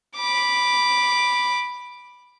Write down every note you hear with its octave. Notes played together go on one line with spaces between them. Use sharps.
B5 D6